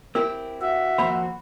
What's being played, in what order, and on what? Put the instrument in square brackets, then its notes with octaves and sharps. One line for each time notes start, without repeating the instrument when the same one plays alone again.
[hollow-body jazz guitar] C4 E4 G4 [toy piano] A#4
[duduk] F#4 [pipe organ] E5
[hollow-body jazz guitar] F2 A#3 C5 [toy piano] B5